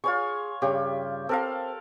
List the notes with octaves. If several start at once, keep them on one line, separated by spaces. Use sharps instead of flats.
F4 G#4 C#5 C#6
G2 C#3 G4
C4 A4 A#4 F5